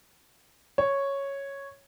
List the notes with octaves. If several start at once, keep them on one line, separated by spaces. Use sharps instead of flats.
C#5